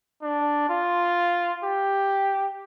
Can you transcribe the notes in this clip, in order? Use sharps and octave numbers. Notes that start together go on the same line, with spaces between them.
D4
F4
G4